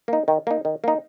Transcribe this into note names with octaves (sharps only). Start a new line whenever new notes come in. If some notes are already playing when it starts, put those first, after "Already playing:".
A#3 D#4
D#3
A#3 D#4
D#3
A#3 D#4